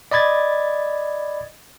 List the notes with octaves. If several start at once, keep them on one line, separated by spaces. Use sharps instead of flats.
D5 D#5 B5 G#6 A6